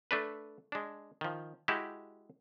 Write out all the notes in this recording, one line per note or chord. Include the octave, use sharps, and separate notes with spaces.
A3 D4 B4
G#3 D4
D#3 F3
G#3 E4 F#4 G4